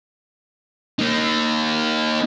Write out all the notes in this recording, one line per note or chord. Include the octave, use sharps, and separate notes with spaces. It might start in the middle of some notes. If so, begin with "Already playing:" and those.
A#3 D#4